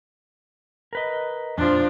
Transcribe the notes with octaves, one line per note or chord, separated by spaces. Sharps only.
A#4 B4 D#5
F2 A#2 F3 D4 F4